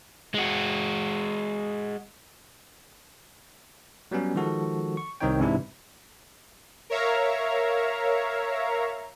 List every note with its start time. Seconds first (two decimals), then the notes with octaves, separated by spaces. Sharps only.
0.34 G#3 F#4
4.11 F#3 G3 B3 C#4
4.35 D#3 F3 G#3 F#4 A4
4.97 C#6
5.21 C2 D#3 C4 D#4 C#5 G5
5.40 G#2 C3 E3 D4 E4
6.90 A#4 C#5 E5 F5 A#5